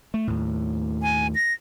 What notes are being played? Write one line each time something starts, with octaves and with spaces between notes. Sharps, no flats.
A3
D#2 A2
G#5
A#6